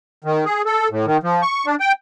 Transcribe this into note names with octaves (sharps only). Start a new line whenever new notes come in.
D#3
G#4
A4
A2
D#3
F3
C#6
D4
G5